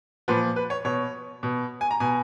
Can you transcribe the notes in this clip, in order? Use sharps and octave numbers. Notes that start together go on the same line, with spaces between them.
A#2 F3 B4
B4
C#5
B2 C#5
B2
G#5
A#5
B2 G#5